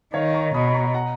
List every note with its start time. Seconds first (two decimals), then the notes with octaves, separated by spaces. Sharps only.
0.14 D#3 C#5 F5
0.34 A#5 C#6
0.54 B2 B5 D#6
0.67 B5
0.74 A#5 C#6
0.94 F#5 A#5